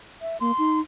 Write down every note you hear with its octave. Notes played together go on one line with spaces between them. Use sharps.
E5
A#3 C6
D#4